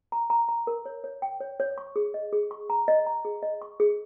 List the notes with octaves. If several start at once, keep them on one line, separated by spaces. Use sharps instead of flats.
A#5
A#5
A#5
A#4
C#5
C#5
G5
C#5
C#5
C#6
G#4
D#5
G#4
C#6
A#5
D#5
A#5
G#4
D#5
C#6
G#4